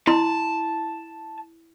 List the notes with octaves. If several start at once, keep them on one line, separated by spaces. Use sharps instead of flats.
E4 A5 C6